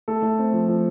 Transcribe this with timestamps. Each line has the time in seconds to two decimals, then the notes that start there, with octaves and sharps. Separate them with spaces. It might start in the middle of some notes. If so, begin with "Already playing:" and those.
0.08 A3 A4
0.22 A3
0.39 C4
0.53 F3
0.68 F3